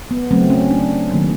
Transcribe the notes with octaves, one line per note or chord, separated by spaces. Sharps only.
B3
C#3 F#3 A3 C4
C#4
D4
D#3 F#3 A#3